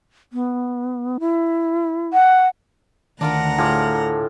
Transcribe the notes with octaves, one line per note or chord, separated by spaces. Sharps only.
B3
E4
F#5
D2 D#3 D4 F4 A#4 F#5 A#5
A2 F4 G#4 G5 A5 D6